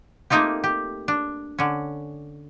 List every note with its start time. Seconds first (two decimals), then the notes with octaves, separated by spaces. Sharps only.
0.30 A3 A#3 C4 D#4 F4 G4
0.64 G4
1.08 D4
1.58 D3 C#4